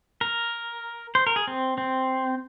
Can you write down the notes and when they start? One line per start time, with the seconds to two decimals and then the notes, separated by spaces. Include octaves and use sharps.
0.21 A#4
1.15 C5
1.27 A#4
1.36 G#4
1.47 C4
1.78 C4